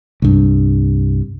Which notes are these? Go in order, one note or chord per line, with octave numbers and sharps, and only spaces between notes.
C2 G2